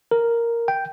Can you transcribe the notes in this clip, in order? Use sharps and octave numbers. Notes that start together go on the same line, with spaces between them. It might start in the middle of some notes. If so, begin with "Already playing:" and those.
A#4
G5